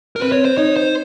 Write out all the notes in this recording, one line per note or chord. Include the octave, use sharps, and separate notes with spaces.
A#4
C4 B4
C#5
C5
D#4 C#5
C5